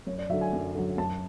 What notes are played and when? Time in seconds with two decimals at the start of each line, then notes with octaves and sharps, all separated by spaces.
0.07 F#2 C#5
0.18 D5
0.30 F#3 E5
0.33 D3
0.41 G#5
0.53 F#2
0.75 D3 F#3
0.98 F#2 A5